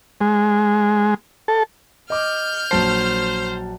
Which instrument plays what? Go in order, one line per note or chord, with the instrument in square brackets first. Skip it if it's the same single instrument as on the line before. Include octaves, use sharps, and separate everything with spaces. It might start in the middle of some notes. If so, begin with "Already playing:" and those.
[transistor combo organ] G#3
A4
[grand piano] D#5 D6 [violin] F6 G6
[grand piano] A#1 F#3 A5 [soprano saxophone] C5